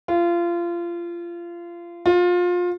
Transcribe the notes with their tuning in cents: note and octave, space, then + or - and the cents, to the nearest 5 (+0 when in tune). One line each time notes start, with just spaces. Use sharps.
F4 -25
F4 +25